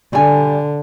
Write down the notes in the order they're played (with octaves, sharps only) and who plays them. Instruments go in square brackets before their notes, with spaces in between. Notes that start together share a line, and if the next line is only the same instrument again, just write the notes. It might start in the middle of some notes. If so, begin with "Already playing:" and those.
[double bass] D3 [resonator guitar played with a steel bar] G3 G#5